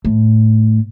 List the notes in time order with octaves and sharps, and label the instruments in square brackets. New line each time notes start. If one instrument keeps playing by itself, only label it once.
[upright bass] A2